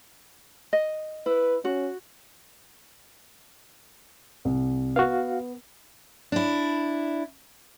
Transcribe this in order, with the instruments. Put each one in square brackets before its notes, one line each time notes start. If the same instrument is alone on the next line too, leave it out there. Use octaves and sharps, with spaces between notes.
[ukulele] D#5
[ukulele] E4 [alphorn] B4
[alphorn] C#4 [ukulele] F#4
[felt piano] C2
[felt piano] B3 [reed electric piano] F#4 F5
[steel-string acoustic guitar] D4 E4